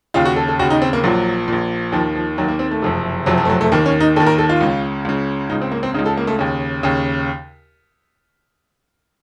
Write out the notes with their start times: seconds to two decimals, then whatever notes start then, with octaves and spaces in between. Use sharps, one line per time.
0.14 D#2 C#3 F4
0.25 F#4
0.36 A4
0.48 A4
0.59 D#2 C#3 F#4
0.70 D#4
0.82 C4
0.93 A#3
1.03 A#1 A#2 F#3
1.48 A#1 A#2
1.92 D#2 D#3 F3
2.15 F3
2.38 D#2 D#3 F#3
2.48 A#3
2.59 C4
2.71 A3
2.82 F#1 F2 C3
3.26 F#1 F2 C3 F#3
3.38 F3
3.45 A3
3.50 F#3
3.61 A3
3.72 D#2 D#3 A#3
3.86 C#4
4.01 D#4
4.16 D#2 D#3 A4
4.27 A#4
4.38 A4
4.49 F4
4.60 C#2 C#3
5.05 C#2 C#3
5.50 C#2 C#3 D#4
5.62 C4
5.72 A#3
5.83 C4
5.94 C#3 D#4
5.99 C#2
6.06 A4
6.17 A#3
6.27 A3
6.39 D#2 C#3
6.83 D#2 C#3